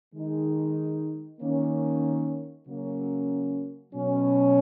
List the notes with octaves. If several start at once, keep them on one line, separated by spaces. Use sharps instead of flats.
D#3 G#3 D#4
D#3 A#3 C#4
C#3 F#3 A#3 C#4
B2 F#3 C#4